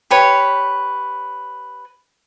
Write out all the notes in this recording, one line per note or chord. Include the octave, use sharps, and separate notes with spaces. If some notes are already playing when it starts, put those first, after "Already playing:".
G4 B4 C#5